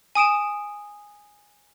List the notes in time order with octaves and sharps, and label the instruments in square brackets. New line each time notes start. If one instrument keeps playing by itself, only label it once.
[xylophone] G#5 D#6 D7 E7